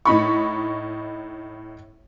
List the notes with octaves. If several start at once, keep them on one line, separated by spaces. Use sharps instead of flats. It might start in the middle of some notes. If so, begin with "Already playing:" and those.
A2 D#4 B5 C#6